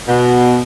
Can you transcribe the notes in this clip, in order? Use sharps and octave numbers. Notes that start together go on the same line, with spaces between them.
B2